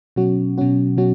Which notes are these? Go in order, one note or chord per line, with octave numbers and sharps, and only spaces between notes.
B2 F#3 C#4 F#4
B2 F#3 C#4 F#4
B2 F#3 C#4 F#4